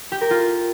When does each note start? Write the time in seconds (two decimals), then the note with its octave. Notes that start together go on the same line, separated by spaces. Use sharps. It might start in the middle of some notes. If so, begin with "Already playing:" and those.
0.12 G4
0.21 A#4
0.31 F4